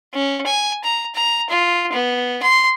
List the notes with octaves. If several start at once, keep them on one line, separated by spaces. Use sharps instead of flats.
C#4
G#5
A#5
A#5
F4
B3
C6